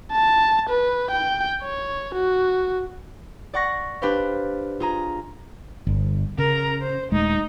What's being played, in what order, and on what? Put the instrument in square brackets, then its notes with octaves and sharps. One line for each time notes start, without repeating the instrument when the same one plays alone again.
[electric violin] A5
B4
G5
C#5
F#4
[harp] D5 F#5 C#6 A#6
D4 G4 B4 C5 F5
F4 G#4 A#5
[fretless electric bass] G1
[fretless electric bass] C#3 [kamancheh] A#4 A#5
[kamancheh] C5
[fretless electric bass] D#1 G#3 A3 [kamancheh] D#4